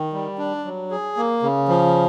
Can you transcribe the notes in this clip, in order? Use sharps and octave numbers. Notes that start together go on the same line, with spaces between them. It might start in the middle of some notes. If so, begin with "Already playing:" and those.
Already playing: D#3
G3
D4
F#3
G#4
A#3
C#3
F3